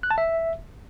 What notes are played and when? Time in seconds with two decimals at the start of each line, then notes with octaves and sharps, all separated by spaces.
0.03 F#6
0.11 A5
0.18 E5